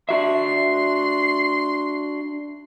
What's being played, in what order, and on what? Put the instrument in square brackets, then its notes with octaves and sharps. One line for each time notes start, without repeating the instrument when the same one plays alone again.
[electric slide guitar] D4 F#4 E5 [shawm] C6